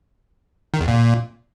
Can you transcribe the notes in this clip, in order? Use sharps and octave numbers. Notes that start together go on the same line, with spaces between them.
D#3
E2
A#2